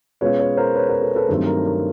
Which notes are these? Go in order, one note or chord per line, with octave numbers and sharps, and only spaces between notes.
B2 G#3 C#4 F4 B4 C#5
B4 C#5
A#4 C5
B4 C#5
A#4 C5
A4 B4
A4 B4
G2 D#3 F#3 A3 C4
A#4
A#4